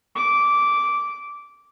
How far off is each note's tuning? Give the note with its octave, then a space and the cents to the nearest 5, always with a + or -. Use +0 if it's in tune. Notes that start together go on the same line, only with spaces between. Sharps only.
D6 -10